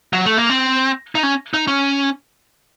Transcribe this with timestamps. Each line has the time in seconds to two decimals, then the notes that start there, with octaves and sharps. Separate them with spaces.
0.13 F#3
0.26 A3
0.38 A#3
0.50 C4
1.15 D#4
1.23 C#4
1.54 D#4
1.68 C#4